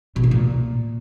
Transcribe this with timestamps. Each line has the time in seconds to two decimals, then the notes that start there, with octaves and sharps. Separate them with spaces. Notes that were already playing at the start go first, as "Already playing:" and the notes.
0.16 B2
0.24 A3
0.31 A#2